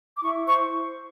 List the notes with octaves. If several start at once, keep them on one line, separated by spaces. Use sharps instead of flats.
D6
E4 C#6
C5 C#6